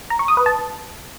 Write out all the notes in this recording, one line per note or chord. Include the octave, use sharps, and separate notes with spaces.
A#5
C#6
D#6
B4
A5